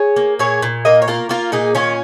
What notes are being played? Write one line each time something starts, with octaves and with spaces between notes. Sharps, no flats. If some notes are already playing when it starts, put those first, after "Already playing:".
Already playing: G#4 C#5
A#3
A#2 G#4 C#5
A#2
A#3 A#4 D#5
C#5
A#3 F4 A#4
A#3 F4 A#4
A#2 D#4 G#4
D#3 C#4 F4